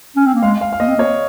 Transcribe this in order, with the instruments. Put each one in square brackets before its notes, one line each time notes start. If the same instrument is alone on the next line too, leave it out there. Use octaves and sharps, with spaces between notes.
[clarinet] C#4
C4
A#3
[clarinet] G#3 [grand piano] F5
[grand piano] F5
F5
[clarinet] A#3 [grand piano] D#5
[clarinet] C4
A#3
[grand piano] C#5